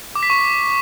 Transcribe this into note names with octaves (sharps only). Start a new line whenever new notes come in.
D6
B6
C#6